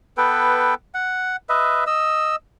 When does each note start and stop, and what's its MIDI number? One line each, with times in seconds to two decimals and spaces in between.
0.18 0.74 59
0.18 0.74 69
0.18 0.74 71
0.18 0.74 79
0.95 1.36 78
1.49 1.84 71
1.49 1.84 75
1.49 1.84 76
1.87 2.36 75
1.87 2.36 88